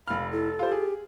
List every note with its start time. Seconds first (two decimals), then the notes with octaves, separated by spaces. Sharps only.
0.08 F1 F5 B5 F6
0.31 E4 A4
0.59 F4 G4 C5
0.72 G#4